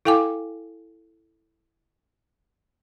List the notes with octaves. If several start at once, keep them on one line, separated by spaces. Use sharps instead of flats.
E4 A4 F5 G5 G#5 D6